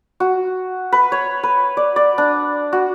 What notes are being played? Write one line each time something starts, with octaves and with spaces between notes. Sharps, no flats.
F#4
B4
C#5
B4
D5
D5
D4
F#4